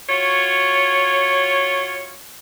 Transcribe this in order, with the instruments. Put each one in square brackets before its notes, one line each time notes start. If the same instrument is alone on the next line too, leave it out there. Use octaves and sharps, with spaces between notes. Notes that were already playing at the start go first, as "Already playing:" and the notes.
[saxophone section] F4 F#4 C#5